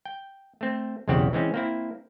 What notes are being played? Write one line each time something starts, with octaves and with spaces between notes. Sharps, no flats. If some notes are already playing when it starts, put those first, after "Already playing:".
G5
A3 C4
B1 E2 C#3 C4 G4 F#5
E3 G#3 C4 C#4
A#3 C4 E4